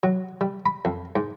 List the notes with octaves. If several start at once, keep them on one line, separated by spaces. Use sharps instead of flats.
F#3
G3
B5
F2
G#2